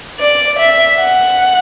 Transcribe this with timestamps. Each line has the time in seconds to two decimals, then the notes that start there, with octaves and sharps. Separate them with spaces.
0.19 D5
0.59 E5
1.00 F#5